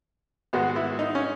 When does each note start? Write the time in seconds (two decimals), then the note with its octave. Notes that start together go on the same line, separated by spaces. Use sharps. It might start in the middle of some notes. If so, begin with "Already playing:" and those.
0.53 G#2 D#3 G#3 B3 F#4
0.76 E4
0.99 D#4
1.15 C#4